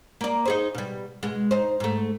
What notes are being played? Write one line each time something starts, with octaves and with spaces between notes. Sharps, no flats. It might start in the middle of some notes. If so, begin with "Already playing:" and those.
A#3 D5
D#4 G#4 C5
B2 G3
B2 G#3
D#4 C5
G#2 A3